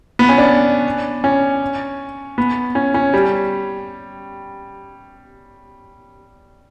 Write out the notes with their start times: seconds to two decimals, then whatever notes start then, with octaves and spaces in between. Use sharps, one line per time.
0.19 B3
0.29 C#4
0.38 D4
1.24 C#4
2.38 B3
2.75 C#4
2.94 C#4
3.14 G3